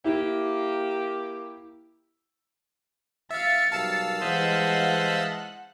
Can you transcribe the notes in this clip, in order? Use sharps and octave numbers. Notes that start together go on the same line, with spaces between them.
A#3 E4 G4
E5 F5 A6 C#7
B1 G3 A#4 F5 A5 E6
E3 G3 G#3 C5 D#5 E5 F#5 F#6